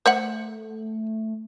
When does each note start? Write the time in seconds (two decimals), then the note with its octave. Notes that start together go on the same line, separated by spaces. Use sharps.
0.06 A3 C5 E5 F#5